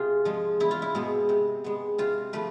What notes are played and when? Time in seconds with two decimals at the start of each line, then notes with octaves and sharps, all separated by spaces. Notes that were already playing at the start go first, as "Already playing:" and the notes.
Already playing: C3 F4 G#4
0.25 F3 G#3
0.60 E2 E4
0.71 F4
0.82 E4
0.95 B2 G#3 B3
1.29 C3
1.64 G#3 B3
1.98 C3 F4
2.33 F3 A3 B4